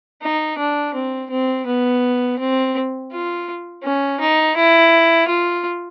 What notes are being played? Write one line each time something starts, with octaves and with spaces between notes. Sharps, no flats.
D#4
D4
C4
C4
B3
C4
F4
C#4
D#4
E4
F4